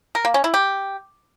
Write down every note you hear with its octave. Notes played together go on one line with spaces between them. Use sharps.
A#4
A#3
C#4
E4
G4